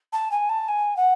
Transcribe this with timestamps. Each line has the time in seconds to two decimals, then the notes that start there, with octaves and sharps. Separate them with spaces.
0.13 A5
0.31 G#5
0.49 A5
0.68 G#5
0.96 F#5